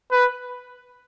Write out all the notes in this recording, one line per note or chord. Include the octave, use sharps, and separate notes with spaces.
B4